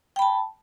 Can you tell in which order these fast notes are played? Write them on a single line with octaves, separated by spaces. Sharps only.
G5 B5 A5